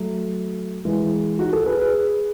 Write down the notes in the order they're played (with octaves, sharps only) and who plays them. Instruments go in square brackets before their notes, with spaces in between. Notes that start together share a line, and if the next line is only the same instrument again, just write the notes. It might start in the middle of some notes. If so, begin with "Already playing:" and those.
Already playing: [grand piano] F#3 A3
E3 G#3
D#4 F#4
F#4 A4
G#4 B4
G#4 B4